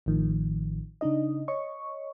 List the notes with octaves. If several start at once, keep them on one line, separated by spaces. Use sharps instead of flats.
A1 A2 D#3 F3
C#3 D4 D#4 D#5
C#5 D#5 C#6